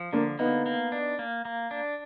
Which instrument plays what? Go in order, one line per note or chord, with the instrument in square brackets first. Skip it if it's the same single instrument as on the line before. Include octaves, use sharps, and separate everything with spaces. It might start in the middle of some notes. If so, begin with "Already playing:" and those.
Already playing: [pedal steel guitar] F3
[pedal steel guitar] D3 [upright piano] A#3 D4
[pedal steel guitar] A#3 [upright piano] B3 D#4
[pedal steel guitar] A#3
D4
A#3
A#3
D4